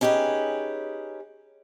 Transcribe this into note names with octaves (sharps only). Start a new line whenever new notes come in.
C#4 D#4 G4 G#4 B4